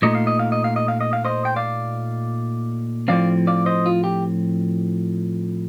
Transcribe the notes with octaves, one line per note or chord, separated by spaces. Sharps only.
A#2 A3 D#4 D#5
F5
D#5
F5
D#5
F5
D#5
F5
D#5
F5
C5 D#5
G5
D5 F5
A2 F3 C4 D5 F5
D5 F5
C5 D#5
F4
G4